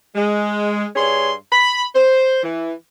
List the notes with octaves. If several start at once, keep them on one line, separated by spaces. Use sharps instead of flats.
G#3
G2 G#4 C#5 C6
B5
C5
E3